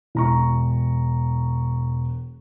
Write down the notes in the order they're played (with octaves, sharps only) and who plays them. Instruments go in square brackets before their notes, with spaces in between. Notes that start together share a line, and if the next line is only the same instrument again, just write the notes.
[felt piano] E1 A#5 C#6